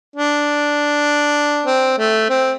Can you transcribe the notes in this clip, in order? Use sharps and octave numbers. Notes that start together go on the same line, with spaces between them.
D4
C4
A3
C4